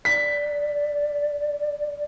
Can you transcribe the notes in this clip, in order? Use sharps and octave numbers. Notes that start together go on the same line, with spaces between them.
D5 B6